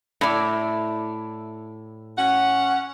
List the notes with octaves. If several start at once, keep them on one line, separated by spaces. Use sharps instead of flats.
A2 E4 D5
C#4 F#5